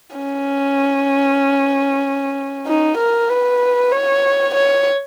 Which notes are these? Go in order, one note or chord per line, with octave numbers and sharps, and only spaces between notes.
C#4
D#4
A#4
B4
C#5
C#5